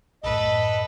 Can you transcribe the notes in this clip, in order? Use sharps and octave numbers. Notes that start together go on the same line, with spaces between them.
B1 F#2 A2 A4 B4 D#5